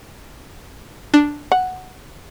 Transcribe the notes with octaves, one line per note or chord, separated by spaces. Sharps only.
D4
F#5